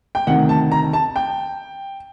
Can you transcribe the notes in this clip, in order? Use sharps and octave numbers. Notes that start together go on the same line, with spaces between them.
G5
D2 C3 D#3 F#5
A5
A#5
A5
G5